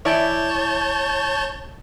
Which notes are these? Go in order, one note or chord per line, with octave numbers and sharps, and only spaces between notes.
E3 E4 C#5 D5 A5 G6